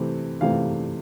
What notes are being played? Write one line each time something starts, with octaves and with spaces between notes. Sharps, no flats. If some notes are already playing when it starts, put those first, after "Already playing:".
Already playing: C3 E3 A3 C4
C3 E3 A3 C4 F5